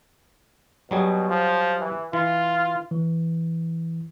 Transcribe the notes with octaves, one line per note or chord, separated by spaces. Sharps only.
B2 F#3 G3 G#4
F3
E3
E3 F4
E3